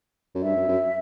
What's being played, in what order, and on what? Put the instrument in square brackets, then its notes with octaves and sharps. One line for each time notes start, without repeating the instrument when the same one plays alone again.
[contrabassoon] F#2
[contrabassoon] G2 [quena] E5
[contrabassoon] F#2
F#2